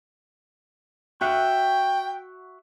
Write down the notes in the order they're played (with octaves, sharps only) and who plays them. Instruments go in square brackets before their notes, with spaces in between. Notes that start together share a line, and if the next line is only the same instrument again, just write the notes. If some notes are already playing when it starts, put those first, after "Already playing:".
[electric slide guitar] F#4 E5 F#5 [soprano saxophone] G5